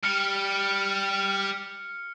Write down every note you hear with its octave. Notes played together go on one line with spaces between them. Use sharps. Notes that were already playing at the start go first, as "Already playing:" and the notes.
G3 F6 C#7